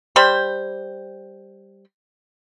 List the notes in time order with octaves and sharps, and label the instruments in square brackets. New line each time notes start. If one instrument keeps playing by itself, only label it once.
[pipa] G3 C5 B5